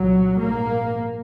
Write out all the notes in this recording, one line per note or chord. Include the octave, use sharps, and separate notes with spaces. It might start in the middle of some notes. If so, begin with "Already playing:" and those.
Already playing: C2 A#2 F#3
A#1 G#2 A#3